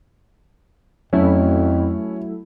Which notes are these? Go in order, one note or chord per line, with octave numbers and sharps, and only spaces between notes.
F2 F#3 A3 C#4 E4